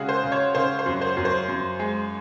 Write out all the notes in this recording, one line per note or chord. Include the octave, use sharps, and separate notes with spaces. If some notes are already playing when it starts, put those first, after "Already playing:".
Already playing: C#3 G#3 F#4 G#4
C5
C#3
C#5
C#3 C5
C5
F#2
C5
F#2
C5
F#2
G#3